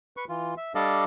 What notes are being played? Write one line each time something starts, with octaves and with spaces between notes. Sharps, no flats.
B4 C#6
E3 F4
E5
G3 D4 A4 D5 D#5 F5